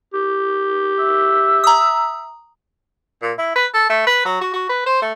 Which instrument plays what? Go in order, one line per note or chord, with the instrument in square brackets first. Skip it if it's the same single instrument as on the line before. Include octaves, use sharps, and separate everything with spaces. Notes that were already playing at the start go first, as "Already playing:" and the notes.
[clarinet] G4
[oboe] E5
[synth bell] A#5 D#6
[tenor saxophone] A#2
E4
B4
A4
A3
B4
F#3
F#4
F#4
B4
C5
A3